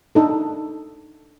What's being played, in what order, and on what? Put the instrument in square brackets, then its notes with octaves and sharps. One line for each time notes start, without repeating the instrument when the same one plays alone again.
[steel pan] D4 D#4 A4